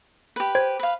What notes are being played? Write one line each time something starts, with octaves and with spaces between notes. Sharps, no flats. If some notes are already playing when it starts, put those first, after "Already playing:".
G4 B4
C5 G#6
B4 F5